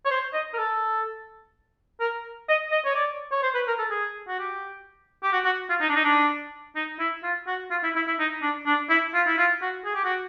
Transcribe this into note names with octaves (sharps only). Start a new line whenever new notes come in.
C#5
C5
D#5
A#4
A4
A#4
D#5
D#5
C#5
D5
C#5
C5
B4
A#4
A4
G#4
F#4
G4
G4
F#4
F#4
F4
D#4
D4
D#4
D4
D#4
E4
F4
F#4
F4
E4
E4
E4
D#4
D4
D4
E4
F4
E4
F4
F#4
G#4
G4
F#4